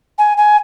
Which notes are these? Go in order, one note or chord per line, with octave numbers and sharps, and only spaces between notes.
G#5
G#5